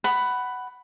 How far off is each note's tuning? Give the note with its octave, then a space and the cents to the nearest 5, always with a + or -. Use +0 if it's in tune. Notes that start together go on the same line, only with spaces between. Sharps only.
F#5 +15 B5 +5